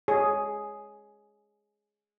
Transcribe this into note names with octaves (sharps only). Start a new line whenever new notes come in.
G#4 C#5